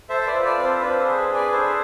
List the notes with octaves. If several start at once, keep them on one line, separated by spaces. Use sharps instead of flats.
A4 C5 E5
E5
B4 D5
F4
B4 D5
C4
A4 C5
D4 B4
A4 C5
G#4
B4
G#4
B4 D5
D4 A4 C5